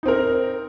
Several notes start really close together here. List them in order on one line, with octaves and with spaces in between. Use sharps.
D#4 C4 A#4